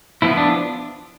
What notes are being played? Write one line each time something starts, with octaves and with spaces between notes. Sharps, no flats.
F3 B3 E4
D4